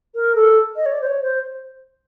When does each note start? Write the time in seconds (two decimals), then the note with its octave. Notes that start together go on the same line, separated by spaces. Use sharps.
0.15 A#4
0.35 A4
0.76 D#5
0.86 C#5
0.92 D5
1.01 C5
1.07 C#5
1.22 C5